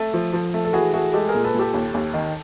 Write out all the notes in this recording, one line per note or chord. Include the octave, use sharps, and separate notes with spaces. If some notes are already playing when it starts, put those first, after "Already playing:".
Already playing: A3 A4
F3
F3
A3
A4
E3 F#4 G#4
A3 F#4 G#4
G#3 G4 A4
G#4 A#4
A#2
A4 B4
A#2 G4 A4
D#2
D#2
D#3